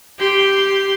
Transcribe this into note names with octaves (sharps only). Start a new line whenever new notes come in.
G4 C6